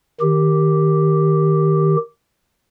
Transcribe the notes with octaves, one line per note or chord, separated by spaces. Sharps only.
D#3 G4